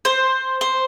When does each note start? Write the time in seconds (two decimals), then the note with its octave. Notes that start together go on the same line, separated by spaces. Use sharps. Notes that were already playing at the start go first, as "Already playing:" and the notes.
0.05 C5
0.61 C5